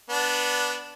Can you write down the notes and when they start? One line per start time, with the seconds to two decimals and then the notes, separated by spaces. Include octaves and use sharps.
0.09 B3 D4